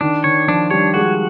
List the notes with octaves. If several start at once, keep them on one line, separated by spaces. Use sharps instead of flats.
D#3 D4
D#3 C#5
F3 D4
G3 C#5
G#3 F#4